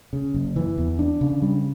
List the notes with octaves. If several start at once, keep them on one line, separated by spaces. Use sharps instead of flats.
C#3
F#1
E3
E2
D4
C#3
G3